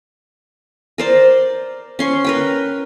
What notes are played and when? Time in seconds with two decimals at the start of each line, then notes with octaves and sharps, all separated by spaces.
0.98 A#4 C5 D5
1.99 C#4 C6 C#6
2.24 A#4 B4 G5